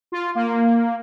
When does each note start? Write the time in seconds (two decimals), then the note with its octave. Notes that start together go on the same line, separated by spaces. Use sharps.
0.12 F4
0.35 A#3